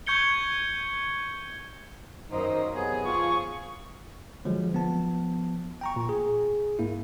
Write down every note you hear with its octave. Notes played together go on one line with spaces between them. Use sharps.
C#6 G6 G#6 C#7 G7
F#2 D#3 A#3 D#4 C5 D#5
C3 F#3 B3 G#4
F3 F4 G#4 C#6
D3 F3 F#3 G#3
F3 B3 A5
G5 A#5 C#6
A#2
G#4
G#2 A#3 E4